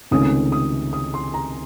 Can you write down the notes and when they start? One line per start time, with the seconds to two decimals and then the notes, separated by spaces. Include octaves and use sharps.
0.11 C#2 C3 D#3 A3 C#4 D#6
0.52 D#6
0.93 D#6
1.14 C6
1.34 A#5